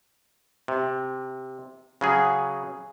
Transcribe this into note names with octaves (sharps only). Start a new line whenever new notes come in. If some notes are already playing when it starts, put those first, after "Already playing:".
C3
C#3 F#3 G#4